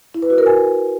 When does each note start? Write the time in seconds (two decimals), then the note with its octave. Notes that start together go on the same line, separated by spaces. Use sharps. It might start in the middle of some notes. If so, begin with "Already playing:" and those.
0.14 E4
0.22 B4
0.30 F#4
0.38 A#4
0.46 G#5